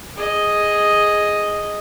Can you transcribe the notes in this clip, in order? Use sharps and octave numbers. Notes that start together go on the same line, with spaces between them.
G#4 D#5